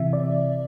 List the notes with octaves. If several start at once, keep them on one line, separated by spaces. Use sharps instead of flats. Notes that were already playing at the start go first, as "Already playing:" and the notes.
Already playing: C3 E3 E5
D5